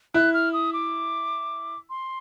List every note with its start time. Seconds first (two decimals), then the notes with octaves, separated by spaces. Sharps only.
0.14 E4 F#6
0.34 F6
0.53 D#6
0.73 D6
1.90 C6